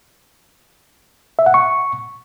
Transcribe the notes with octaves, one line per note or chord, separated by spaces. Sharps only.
E5
F#5
C#6